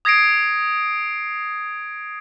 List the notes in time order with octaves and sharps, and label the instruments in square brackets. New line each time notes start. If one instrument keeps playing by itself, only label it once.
[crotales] D#6 G#6 A#6 C7 D7